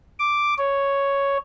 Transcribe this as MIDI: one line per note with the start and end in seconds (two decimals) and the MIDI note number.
0.19 0.54 86
0.58 1.38 73